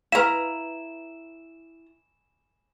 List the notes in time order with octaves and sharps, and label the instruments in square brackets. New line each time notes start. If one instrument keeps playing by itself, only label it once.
[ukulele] E4 A#5 [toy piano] B4 F5 [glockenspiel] E7